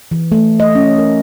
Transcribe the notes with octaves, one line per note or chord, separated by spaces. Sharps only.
E3
A3
D#5
C#4
A#4